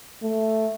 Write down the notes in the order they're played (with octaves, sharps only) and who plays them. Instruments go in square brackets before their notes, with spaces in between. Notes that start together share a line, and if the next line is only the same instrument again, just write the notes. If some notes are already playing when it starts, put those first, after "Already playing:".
[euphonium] A3